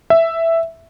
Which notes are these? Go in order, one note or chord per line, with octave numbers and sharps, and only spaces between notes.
E5